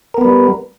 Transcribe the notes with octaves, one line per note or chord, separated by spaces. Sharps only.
G3 B3 A#4 B4